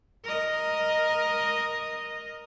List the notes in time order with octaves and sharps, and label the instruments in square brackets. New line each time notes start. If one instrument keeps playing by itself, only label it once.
[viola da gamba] A#4 D#5